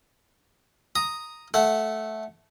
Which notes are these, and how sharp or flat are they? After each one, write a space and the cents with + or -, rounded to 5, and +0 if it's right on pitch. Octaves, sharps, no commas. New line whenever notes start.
A#5 +0 D#6 +0
A3 -10 F#5 -5